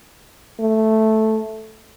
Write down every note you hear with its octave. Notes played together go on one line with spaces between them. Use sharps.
A3